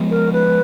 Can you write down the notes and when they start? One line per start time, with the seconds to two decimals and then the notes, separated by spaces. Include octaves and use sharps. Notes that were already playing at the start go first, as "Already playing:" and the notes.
Already playing: F3 G#3 B3
0.10 A#4
0.33 B4